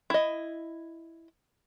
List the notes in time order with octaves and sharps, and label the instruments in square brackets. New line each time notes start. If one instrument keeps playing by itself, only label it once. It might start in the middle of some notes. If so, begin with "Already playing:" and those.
[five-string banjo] E4 D#5